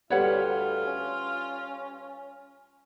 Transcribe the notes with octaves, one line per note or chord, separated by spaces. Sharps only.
D2 G3 F4 B4 C#5 F5 F#5
C#4